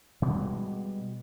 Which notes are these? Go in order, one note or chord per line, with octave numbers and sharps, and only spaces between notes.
B2 G3 G#3 B3